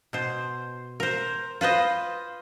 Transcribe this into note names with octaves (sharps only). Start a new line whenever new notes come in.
B2 C5
A#4 C5
F4 B4 C5 D#5